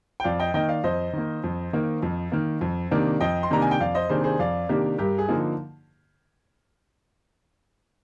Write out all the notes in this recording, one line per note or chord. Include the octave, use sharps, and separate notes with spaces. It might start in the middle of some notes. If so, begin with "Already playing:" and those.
G5
F2 D5 F5
D#5 G5
D#3 A#3 D#5 G5
D5 F5
F2 C5 D#5
D#3 A#3
F2
D#3 A#3
F2
D#3 A#3
F2
C3 D#3 A#3 D4
F2 D#5 G5
C6
C3 D#3 A#3 D4 A#5
G#5
G5
F2 D5 F5
C5 D#5
C3 D#3 A#3 D4 G#4 C5
G#4 C5
F2 D5 F5
C3 D#3 A#3 D4 G4 A#4
G2 G4 A#4
G#4
D3 F3 A#3 D#4